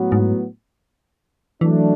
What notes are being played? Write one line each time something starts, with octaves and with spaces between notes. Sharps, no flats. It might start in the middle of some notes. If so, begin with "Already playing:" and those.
Already playing: A2 F#3 B3 F#4
G#2
E3 F#3 A3 D4